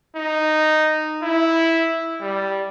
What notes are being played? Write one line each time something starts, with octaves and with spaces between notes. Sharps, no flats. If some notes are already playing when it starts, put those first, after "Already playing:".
D#4
E4
G3